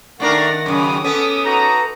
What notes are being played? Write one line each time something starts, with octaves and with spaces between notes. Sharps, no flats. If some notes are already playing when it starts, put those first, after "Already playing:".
D#3 A3 D4 A#4 D5 F#5 A#6
F#2 C#3 D6 D#6
B3 C#4 A4
D#4 F#4 A4 B4 A#5